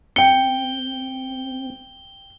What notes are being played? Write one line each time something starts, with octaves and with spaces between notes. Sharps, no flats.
C4 G5 C#7 G7